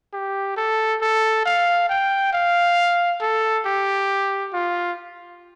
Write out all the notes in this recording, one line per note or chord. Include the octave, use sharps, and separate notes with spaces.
G4
A4
A4
F5
G5
F5
A4
G4
F4